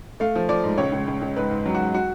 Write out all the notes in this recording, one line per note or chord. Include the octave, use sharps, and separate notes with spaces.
A3 F5
F3
F3 D5
G#2
C#2 C#5
C#2
C#2
C#2
G#2 B4
G#2
F#3
G#2 F#4
F#4